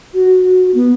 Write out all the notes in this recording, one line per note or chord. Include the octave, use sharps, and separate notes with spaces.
F#4
B3